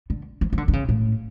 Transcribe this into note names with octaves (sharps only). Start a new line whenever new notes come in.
D3
F3
F3
D3
D3
C#3
A2